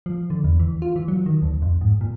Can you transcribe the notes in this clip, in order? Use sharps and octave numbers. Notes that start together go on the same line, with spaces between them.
F3
D3
E2
E3
F4
E3
F#3
D#3
D2
F2
G#2
A#2